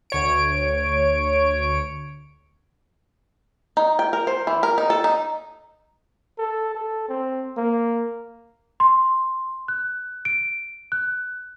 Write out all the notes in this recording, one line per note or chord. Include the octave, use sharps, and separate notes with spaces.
D2 C#5 D7
D#4
G5
A#4
C5
E3
A#4
D#4
A4
D#4
A4
A4
C4
A#3
C6
F#6
D7
F#6